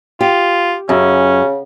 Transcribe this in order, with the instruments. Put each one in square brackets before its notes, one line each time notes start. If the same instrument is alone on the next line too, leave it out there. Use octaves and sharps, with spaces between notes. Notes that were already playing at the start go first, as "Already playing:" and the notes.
[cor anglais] F4 [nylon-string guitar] G4
[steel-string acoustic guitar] F#2 [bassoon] C#3 [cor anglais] C#4